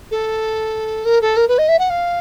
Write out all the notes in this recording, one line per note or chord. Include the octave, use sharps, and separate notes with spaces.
A4
A#4
A4
A#4
B4
D#5
E5
F#5
F5